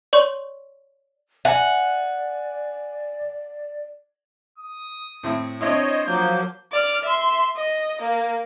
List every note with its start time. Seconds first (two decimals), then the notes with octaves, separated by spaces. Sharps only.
0.13 C#5 D5 C6 C#6
1.45 D5 E5 F#5 G#5
4.58 D#6
5.23 A2 C4 E4
5.61 C4 D4 E4 C5 C#5 D#5
6.06 F3 F#3 A#3 G6
6.72 D5 F6
7.05 E5 C6
7.56 D#5
8.02 A#3